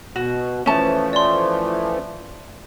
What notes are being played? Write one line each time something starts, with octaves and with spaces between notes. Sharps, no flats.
B2 F#4
E3 F3 A3 C#4 A5
D5 C6